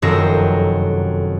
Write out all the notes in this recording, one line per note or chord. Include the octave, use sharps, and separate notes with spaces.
F1 F#2 D#3 C4 A4 A#6